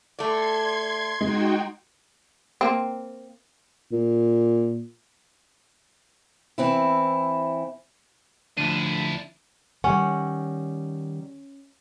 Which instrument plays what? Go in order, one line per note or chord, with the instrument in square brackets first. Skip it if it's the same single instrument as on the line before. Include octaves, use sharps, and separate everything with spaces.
[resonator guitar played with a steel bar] A3 D5 [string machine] C6 G#6
[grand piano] G#3 [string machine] D#4 F#4 G5
[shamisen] A#3 C4
[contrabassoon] A#2
[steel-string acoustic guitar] E3 C4 E4
[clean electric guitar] D2 D3 F3 [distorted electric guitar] D4 E4 [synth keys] D#7
[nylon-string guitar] D#3 G3 F#5 [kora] C#4